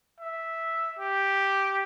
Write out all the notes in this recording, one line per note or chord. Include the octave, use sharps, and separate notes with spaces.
E5
G4